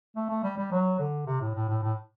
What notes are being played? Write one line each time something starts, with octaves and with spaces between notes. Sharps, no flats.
A3
A3
G3
G3
F#3
D3
C3
A2
A2
A2
A2